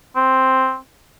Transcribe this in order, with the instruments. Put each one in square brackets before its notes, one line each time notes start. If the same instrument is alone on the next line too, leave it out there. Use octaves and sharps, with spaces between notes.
[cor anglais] C4